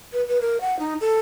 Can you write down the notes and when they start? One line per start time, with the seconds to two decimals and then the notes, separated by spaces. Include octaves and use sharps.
0.13 B4
0.28 B4
0.41 A#4
0.61 F#5
0.79 D#4
1.01 A4